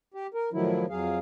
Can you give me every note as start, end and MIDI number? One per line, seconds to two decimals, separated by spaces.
0.14 0.27 67
0.34 0.50 70
0.53 0.86 45
0.53 0.86 51
0.53 0.86 53
0.53 0.86 54
0.53 0.86 64
0.90 1.19 41
0.90 1.19 54
0.90 1.19 68
0.90 1.19 77